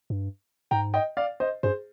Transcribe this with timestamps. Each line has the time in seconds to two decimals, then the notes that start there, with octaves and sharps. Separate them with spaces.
0.10 G2
0.71 G#2 G5 A#5
0.94 D#5 G5
1.17 D5 F5
1.40 C5 D#5
1.63 G2 G#4 C5